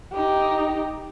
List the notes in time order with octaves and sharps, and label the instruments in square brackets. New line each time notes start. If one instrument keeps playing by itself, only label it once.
[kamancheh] D#4 G4